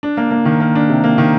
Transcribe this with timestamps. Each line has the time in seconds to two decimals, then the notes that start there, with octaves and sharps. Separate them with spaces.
0.03 D4
0.17 A#3
0.31 A#3
0.45 D#3
0.60 A#3
0.75 D4
0.89 C3
1.04 A#3
1.18 D#3